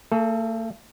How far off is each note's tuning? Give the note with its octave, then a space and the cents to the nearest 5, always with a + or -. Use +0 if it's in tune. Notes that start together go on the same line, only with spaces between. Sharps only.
A3 +45 A4 -25